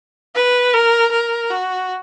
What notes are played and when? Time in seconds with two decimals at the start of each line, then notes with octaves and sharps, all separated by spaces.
0.35 B4
0.74 A#4
1.11 A#4
1.50 F#4